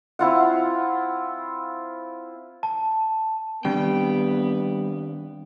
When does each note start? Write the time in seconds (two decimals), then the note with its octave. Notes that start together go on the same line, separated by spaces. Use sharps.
0.19 C4 E4 F4 F#5
2.63 A5
3.65 D#3 G3 B3 C4 D4 G5